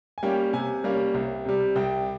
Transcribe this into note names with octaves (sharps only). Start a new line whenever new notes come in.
G#5
G3 A#3 C#4 G5
C3 G#5
G3 A#3 C#4
C2
C3 G3
C2 G5